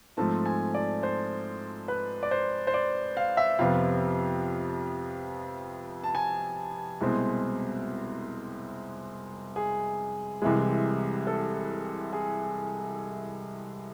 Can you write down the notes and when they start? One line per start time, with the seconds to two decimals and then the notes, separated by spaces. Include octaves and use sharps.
0.17 G#2 F3 A3 C4 A5
0.46 G#5
0.74 D5
1.03 C5
1.88 B4
2.23 D5
2.31 C5
2.67 C5
2.74 D5
3.17 F5
3.37 E5
3.59 F2 C3 F3 B3 F5
6.04 A5
6.15 G#5
7.01 C2 B2 G#3 C4
9.56 G#4
10.42 C2 C3 E3 G#3
11.27 A4
12.13 G#4